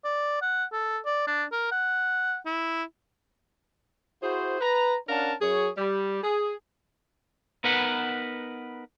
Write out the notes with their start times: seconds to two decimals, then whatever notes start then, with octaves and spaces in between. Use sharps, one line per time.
0.05 D5
0.42 F#5
0.72 A4
1.05 D5
1.27 D4
1.52 A#4
1.72 F#5
2.46 E4
4.23 E4 F#4 G#4 C5
4.61 B4 A#5
5.09 C#4 D4 A#4 F5 F#5 A5
5.41 F#2 G#4 C#5
5.77 G3
6.23 G#4
7.64 B3 D#4 A#4 B4 F#5